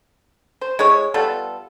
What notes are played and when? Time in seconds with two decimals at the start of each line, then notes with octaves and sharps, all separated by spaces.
0.61 C5
0.79 G#3 E4 C#5
1.14 G3 B3 F4 A4